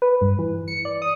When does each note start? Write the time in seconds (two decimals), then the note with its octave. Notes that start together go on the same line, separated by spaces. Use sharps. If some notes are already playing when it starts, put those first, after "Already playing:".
0.02 B4
0.21 G2
0.39 E3
0.68 C#7
0.85 D5
1.02 D#6